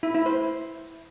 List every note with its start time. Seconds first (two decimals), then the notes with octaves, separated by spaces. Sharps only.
0.03 E4
0.14 E4
0.26 C5